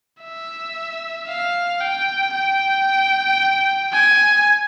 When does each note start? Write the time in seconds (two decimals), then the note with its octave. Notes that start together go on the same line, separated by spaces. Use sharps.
0.22 E5
1.28 F5
1.80 G5
2.33 G5
3.93 G#5